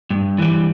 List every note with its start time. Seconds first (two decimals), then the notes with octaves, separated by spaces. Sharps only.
0.10 G2
0.38 E3 G3